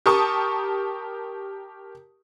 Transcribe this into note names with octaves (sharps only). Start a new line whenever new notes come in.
G4 A#4 A5 C#6 D#6